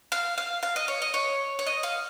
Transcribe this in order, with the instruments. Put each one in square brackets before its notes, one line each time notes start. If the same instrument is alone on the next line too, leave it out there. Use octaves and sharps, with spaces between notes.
[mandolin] F5
F5
F5
D#5
C#5
D#5
C#5
C#5
D#5
F5